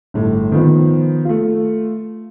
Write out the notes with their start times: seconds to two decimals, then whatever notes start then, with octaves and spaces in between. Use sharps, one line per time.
0.14 G1 A2
0.52 D#3 F3 B3
1.25 A3 F4